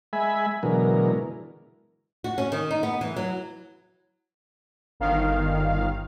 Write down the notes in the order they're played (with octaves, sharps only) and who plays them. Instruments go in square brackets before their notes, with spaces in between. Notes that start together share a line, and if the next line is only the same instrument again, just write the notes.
[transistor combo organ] G#3 E5 G#5 B5
B2 D3 E3 F#3 G#3 A#4
[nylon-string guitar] F#4
C#4
D#3
D#4
B3
E3
F#3
[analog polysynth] G1 D#3 F5